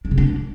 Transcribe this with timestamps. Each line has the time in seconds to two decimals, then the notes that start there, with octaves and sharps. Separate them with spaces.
0.05 D4
0.11 C#3
0.18 D4